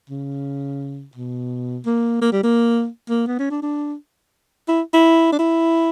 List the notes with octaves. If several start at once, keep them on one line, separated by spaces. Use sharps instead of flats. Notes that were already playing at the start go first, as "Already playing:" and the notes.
C#3
B2
A#3
A#3
G3
A#3
A#3
B3
C#4
D4
D4
E4
E4
D4
E4